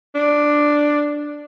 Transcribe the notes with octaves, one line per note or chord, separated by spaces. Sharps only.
D4